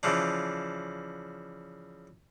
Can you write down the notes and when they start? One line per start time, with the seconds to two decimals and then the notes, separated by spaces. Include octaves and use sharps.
0.03 C#3 E3 F3 D4